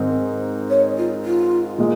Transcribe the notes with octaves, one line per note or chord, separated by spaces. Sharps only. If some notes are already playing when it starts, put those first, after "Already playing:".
Already playing: G#2 D#3 G#3 C4 D#4
C#5
F4
F4
A#2 G#3